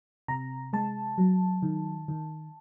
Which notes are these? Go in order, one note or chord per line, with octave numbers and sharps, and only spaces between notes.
C3 A#5
G#3 A5
F#3
D#3
D#3